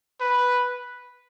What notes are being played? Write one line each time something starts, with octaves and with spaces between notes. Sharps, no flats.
B4